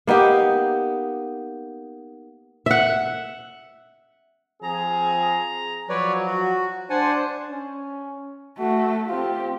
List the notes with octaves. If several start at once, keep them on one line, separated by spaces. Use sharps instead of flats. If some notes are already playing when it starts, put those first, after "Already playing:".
A#3 B3 D#4 G4
E5 F#5
F3 C4 G#4 A#5
F3 F#3 B4 C#5 D5
F#4
D4 C5 F#5 G#5 A5
C#4
A3 F#4
C4 F4 G4